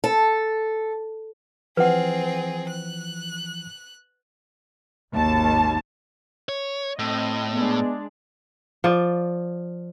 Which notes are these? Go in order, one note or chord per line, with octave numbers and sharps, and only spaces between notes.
A4
E3 F3 C4 G#4 B4 F#5
F#6
G#1 D#2 A5
C#5
A2 C4 D#5
G#3 B3 D4
F3 D5